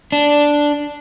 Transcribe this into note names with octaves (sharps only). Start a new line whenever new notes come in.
D4